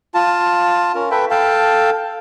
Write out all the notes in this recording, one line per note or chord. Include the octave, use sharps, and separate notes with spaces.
F4 A5
C#4 A#4
A4 B4 E5 G5
A4 F5 G5 A5